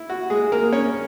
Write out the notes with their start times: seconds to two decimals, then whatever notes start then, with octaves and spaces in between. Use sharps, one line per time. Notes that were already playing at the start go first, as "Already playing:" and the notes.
Already playing: E4
0.10 F#4
0.30 G#3 G#4
0.52 A#3 A#4
0.72 C#4 C#5